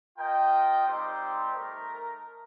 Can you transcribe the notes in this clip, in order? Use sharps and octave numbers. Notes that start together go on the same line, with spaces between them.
F4 A#4 D#5 G5
G3 C4 D#4 G4 C5
A3 D#4 A#4